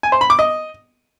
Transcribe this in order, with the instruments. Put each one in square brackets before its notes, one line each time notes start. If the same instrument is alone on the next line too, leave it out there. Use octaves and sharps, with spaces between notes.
[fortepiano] G#5
C5
B5
D6
D#5